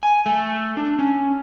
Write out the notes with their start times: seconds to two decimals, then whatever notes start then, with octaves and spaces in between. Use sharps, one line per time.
0.03 G#5
0.26 A3
0.77 D4
0.99 C#4